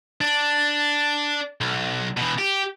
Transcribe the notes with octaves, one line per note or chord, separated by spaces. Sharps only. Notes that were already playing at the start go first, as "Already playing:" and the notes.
D4
B1
B2 E3
G4